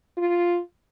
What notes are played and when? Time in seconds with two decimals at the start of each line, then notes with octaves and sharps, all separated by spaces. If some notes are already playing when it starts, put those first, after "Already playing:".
0.17 F4